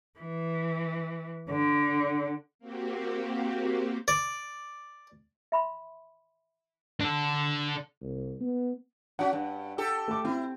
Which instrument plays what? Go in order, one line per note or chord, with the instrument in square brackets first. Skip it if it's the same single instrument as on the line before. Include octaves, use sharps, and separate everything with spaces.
[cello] E3
D3
[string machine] A#3 C4 F#4 G4
[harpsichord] D5
[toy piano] E5 B5 C6
[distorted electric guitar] D4 A4
[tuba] C2
B3
[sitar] C#4 F#4 [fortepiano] F#5
[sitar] G2
G4 A4
[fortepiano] A3 D6
[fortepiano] C4 [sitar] E4